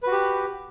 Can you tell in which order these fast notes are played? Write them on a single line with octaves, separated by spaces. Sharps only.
B4 F#4 G4